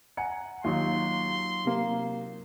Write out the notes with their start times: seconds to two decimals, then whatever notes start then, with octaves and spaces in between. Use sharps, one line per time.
0.17 F#5 G#5 A#5 C#7
0.64 D#2 F#3 D#4 F4 C6
1.65 C3 A#3